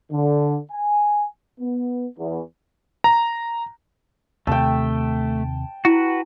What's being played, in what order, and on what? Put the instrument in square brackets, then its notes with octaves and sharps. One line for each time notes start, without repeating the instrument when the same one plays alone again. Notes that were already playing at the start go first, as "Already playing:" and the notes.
[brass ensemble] D3
G#5
B3
E2
[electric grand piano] A#5
[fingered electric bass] D#2 C3 [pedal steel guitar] A3 [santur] G5 A5
[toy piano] E4 A#5 [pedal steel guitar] F#4 B4